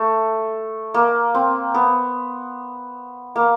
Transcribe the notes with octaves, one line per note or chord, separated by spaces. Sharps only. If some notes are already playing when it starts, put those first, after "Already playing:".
Already playing: A3
A#3
C4
B3
A#3